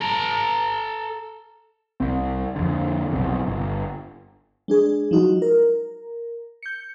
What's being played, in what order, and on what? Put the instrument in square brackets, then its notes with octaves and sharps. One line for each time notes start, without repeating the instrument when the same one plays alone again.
[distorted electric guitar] A4 A#5
[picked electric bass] C2 C4
F2 D3
B1 C3
G1
[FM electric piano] G#3 D4 G#4
F3 F#3 D#4 F#4
A#4
G6 C#7